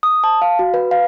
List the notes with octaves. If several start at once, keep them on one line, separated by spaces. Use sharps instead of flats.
D#6
A5
F5
F#4
B4
F5